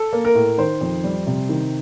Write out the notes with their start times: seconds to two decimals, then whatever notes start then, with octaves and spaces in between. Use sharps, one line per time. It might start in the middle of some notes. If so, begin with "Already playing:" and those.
Already playing: A4
0.13 A#3
0.25 A#4
0.35 A2
0.58 D#3 C5
0.81 F2
1.04 G3
1.27 C3
1.49 D#3